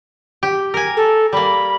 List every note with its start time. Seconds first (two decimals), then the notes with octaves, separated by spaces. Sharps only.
0.43 G4
0.74 A#4 G#5
0.97 A4
1.33 G3 A#3 B5